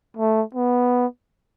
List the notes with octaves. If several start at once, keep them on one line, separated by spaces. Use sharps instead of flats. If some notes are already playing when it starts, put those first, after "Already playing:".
A3
B3